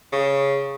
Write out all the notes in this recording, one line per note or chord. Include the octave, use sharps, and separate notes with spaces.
C#3